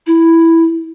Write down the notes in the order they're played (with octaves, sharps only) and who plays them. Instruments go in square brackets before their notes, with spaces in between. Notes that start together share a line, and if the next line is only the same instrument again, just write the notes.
[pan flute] E4